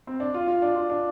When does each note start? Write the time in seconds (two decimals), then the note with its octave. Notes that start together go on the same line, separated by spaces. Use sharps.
0.07 C4
0.20 D4
0.34 F4
0.47 F4
0.62 D4
0.76 F4
0.90 D4